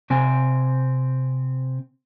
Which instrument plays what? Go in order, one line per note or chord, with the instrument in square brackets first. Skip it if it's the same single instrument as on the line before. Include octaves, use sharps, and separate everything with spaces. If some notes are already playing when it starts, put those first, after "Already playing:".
[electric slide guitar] C3 C4 G#5